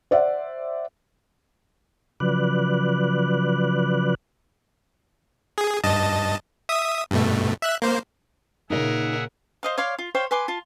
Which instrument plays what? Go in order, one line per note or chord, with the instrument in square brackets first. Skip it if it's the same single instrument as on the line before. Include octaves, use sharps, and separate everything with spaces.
[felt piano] C5 D5 E5 F#5
[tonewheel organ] C#3 F3 F#3 B4 D5 F#6
[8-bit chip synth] G#4
G2 D#5 A5
E5 D#6
G2 B2 A3
E5 F#6
A#3 C5
[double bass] A#2 C#3 [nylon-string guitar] D#4 D#5 [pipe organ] G#4 E5 F#5 [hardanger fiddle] A#4
[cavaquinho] C5 D#5 F5
C#5 D5 F5 C6
F4
C5 C#5 F5 G5
B4 G#5 C6 D6
F4 A5